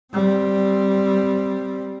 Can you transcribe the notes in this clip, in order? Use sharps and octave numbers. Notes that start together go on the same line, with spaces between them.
G3 C4